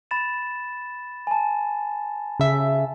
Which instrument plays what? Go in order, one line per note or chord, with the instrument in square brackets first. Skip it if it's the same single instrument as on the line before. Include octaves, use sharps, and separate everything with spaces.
[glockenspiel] B5 A6 E7
G#5 A5
[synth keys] C#3 E5